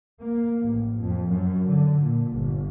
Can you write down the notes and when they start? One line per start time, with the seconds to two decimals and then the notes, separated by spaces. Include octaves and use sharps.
0.20 A#3
0.61 A1
0.97 F2
1.28 F#2
1.68 D3
2.01 A#2
2.30 G1